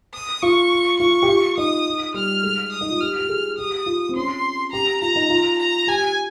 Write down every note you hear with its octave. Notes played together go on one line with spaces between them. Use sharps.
D#6
F4 C#6
F4 C#6
G4
F4
D#4 D#6
G3 F6
G#3
D#6
D#4
F4
G4 F6
G4
G#4
G4 D#6
F4
C4
C#4 C6
G4 A#5
F4 A#5
D#4
F4
A#5
G4 G#5